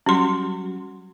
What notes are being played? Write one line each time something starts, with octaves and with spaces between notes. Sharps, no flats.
F#3 G3 C#4 F#4 C6